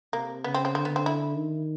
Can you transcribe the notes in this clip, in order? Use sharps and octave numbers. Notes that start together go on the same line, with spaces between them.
C3 A#3
C#3 B3
C4
C4
D3 C4
B3
C4
E4
D#3